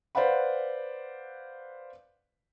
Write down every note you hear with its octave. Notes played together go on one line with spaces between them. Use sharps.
B4 C5 D5 F5 F#5 B5